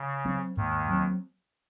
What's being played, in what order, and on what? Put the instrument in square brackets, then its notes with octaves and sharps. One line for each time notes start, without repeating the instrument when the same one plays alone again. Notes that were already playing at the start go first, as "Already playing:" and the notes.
Already playing: [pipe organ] C#3
[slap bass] F#3 C4
[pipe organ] D#2 D#3 [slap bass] G#2
[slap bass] F#3 C4